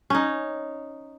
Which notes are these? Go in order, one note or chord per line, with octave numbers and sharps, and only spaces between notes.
C#4 D#4